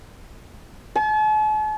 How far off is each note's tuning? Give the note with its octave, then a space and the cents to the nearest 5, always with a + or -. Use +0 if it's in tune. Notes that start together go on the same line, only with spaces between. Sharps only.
A5 -45